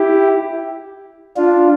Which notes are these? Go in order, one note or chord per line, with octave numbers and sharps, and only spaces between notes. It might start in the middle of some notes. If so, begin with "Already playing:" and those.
Already playing: E4 G4
D4 F4